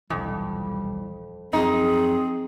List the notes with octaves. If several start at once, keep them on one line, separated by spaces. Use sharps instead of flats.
D#1 B1 F2 E3 G3
F#2 F3 C4 D#4 G#4